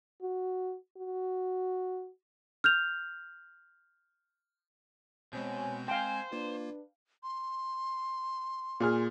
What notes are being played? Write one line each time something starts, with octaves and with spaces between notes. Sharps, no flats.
F#4
F#4
F6 G6 F7
B2 G#3 C4 C5 C#5 G#5 G6
C5 F5 G5 G#5
A#3 D4 F4 B4
C6
A#2 G#4 F6